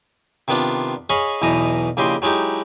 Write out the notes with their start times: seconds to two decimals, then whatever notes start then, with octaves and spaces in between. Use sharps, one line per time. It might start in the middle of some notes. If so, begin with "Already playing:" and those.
0.48 C3 D#3 B3 D4 F4
1.10 G#4 C#5 D#5 F5 G#5 B5
1.42 B1 E2 B2 E3 D#5 A#5
1.97 A#1 C#3 E4 G4 D#5 C6
2.22 F#3 G#3 D#4 E4 G4